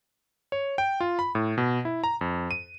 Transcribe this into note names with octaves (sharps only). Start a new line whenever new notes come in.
C#5
G5
F4
B5
A2
B2
E4
A#5
F2
D#7